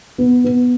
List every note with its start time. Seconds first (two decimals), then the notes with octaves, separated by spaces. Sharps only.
0.18 B3
0.44 B3